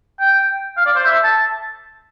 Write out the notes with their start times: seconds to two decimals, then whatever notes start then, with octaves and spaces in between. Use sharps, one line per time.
0.20 G5
0.77 F5
0.86 D5
0.96 C5
1.06 E5
1.24 A5